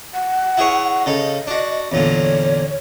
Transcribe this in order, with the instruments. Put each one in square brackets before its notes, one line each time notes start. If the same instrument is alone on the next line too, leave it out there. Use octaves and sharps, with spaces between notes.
[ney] F#5
[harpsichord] E4 G#4 C#5
[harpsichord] C#3 A4 [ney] D#5
[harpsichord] D4 F#4
[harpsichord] E2 A#2 D3 [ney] C#5